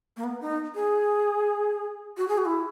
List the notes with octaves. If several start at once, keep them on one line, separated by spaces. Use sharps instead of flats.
A#3
B3
D#4
G#4
F#4
G#4
F#4
E4